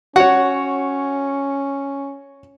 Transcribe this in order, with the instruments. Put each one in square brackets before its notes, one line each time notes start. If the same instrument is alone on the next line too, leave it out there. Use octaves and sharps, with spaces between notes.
[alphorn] C#4 [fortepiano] F#4 C#5 [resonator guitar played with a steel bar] F#5